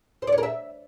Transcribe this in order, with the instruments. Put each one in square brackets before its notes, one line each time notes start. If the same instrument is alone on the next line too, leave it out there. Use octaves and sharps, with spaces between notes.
[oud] C5
D5
C#5
A#4
E5